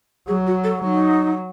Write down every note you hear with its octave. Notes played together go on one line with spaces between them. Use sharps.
F#3 G#4
F#4
A4
F#3 D#4